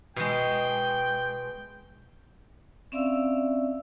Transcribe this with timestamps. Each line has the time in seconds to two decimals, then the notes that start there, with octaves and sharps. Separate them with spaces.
0.16 B2 G#3 G5
2.92 C4 C#4 D5 E5 F5 E6